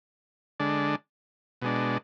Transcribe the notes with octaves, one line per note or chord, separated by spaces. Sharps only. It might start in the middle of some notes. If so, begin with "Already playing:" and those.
D3 G#3 D4
B2 G#3 D4